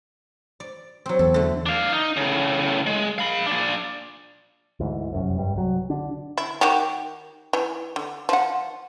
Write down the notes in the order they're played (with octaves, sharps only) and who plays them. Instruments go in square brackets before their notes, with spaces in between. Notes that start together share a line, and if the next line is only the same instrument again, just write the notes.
[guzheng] D5
F#3 C4
[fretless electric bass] E2 [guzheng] A4
[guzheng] D3 A3
[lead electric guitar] D4 F5
D#4
A2 C#3
G#3
F5 B5
A#2 D4
[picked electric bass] D2 G#2 E3
F1 C2 F#2
G2 G3
C2 F#3
D3 D4
[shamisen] E4
D#3 F#4 G4
E3
D3
F3 F#5